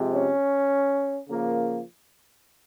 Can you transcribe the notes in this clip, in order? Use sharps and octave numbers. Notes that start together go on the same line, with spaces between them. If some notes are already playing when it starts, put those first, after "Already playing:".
Already playing: C3 F3 G#3
C#4
C#3 F3 A#3